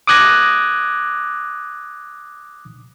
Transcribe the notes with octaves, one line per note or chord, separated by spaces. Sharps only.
D6 D#6 F#6 G#6 A#6